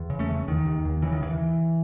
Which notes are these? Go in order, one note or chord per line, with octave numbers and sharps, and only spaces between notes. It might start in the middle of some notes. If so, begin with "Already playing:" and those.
Already playing: E2
C#3
A3 C#4
E2
D#2 D#3
D#2
D#2
C#3 E3
D#3
D#2 E3